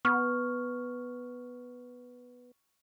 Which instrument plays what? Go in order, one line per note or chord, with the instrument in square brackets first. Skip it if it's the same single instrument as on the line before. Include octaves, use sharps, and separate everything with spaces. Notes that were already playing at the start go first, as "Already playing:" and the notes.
[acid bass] B3 [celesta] C#6 F6